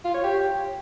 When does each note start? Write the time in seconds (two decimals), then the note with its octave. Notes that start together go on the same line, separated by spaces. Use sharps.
0.04 F4
0.14 C#5
0.24 G4